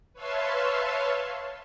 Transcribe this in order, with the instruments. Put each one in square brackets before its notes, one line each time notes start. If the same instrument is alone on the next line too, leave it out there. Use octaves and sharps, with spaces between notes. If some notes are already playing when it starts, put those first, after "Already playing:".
[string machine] B4 C#5 E5 F5 A5 C6